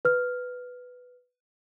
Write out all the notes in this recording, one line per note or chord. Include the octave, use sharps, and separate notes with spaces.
B4 F6